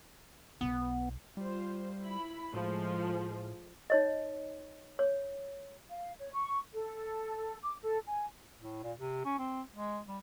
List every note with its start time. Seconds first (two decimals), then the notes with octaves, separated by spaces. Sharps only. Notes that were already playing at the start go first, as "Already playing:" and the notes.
0.61 B1 B3
1.37 G3 F4 C5
2.01 E4 B5
2.54 A2 F3 G#3 A3
3.90 D#4 C#5 D#5
4.99 C#5
5.90 F5
6.18 C#5
6.34 C#6
6.74 A4
7.62 D6
7.82 A4
8.07 G#5
8.60 A2
8.83 A#2
8.98 C3
9.25 C#4
9.39 C4
9.76 G#3
10.08 G3